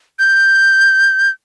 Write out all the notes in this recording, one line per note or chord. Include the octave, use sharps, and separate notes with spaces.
G6